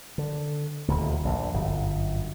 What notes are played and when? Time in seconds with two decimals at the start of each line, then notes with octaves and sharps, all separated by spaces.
0.18 D3
0.88 D#1 D2
1.25 A#1 F#2 A#2
1.54 G1 F#2